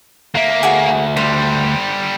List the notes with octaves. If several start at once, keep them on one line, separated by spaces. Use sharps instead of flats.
D2 A#3 E5
F#4 G#4 G#5
D3 G3 C5